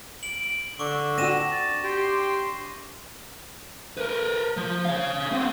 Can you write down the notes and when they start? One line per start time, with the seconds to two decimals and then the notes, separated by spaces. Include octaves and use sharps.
0.23 D7 F#7
0.79 D3 C#6 D6 E6
1.18 C4 D4 F#4 A#6 D#7 E7
1.52 A6
1.84 G4 C6
3.98 A#4 B4
4.57 F3
4.85 C#5 F5
5.32 B3 C4